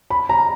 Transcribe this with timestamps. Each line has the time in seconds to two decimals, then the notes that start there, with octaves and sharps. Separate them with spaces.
0.10 B5
0.29 A#5